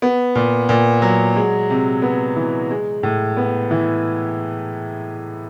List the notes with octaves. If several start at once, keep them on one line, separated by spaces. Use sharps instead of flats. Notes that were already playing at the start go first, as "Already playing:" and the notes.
B3
A#2
A#2
F#3
G#3
C3
B3
E3
G#3
A2
B3
E3